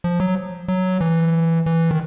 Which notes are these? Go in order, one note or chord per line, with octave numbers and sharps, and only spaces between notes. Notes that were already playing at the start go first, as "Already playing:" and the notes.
F3
F#3
F#3
E3
E3
D#3